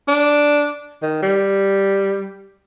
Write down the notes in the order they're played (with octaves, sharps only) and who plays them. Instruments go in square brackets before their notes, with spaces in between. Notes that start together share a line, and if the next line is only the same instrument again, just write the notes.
[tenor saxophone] D4
D#3
G3